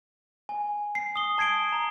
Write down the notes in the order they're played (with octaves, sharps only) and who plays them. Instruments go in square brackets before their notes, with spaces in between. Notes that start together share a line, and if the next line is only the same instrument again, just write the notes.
[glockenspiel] G#5
C7
D#6 G7
A5 G#6 C7 D7 G7
A#5